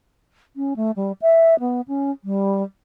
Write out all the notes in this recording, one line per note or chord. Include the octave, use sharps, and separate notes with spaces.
C#4
A3
G3
E5
B3
C#4
G3